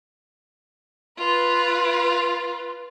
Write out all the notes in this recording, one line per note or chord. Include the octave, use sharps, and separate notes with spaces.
F4 B4